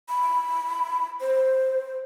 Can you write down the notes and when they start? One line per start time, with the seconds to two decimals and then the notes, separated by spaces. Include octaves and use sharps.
0.09 B5
1.20 C5